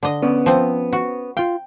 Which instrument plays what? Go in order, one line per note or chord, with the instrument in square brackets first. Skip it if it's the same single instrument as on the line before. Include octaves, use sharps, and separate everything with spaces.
[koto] D3 D#5
[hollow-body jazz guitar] B3 C#4 D5
[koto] F3 C4
F#4
[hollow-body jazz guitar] F4 F5 [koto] G5